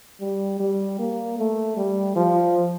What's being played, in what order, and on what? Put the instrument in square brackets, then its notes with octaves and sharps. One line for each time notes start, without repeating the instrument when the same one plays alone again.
[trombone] G3
G3
A#3
A3
G3
F3